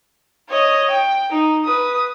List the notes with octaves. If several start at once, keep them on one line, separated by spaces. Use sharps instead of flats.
C#5 D#5
G5
D#4
B4 D#6